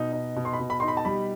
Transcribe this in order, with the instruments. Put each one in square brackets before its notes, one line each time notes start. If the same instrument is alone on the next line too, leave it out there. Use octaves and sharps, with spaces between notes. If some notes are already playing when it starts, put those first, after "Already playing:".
Already playing: [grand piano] B2 D#4
D#4
B2
[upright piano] C6
B5
[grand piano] B2
[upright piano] B5
C6
[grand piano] D#4
[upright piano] B5
A5
[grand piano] G3 [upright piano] B5